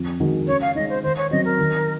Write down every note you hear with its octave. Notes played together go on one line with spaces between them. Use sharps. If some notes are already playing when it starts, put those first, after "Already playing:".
Already playing: F2
D#3 G#3 D#4 F#4
C#3 C#5
F5
G#3 D#4 D#5
C5
D#3 C5
C#5
F#3 C4 F#4 D#5
A#4
D#3